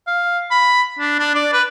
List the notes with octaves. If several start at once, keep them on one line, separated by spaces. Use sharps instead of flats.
F5
B5
D4
D4
D5
B4